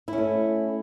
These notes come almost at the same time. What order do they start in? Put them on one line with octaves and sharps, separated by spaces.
E4 C#4 A3